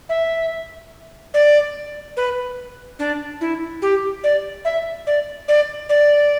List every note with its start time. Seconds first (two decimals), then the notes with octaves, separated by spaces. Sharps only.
0.09 E5
1.34 D5
2.17 B4
2.99 D4
3.41 E4
3.82 G4
4.24 D5
4.65 E5
5.07 D5
5.48 D5
5.89 D5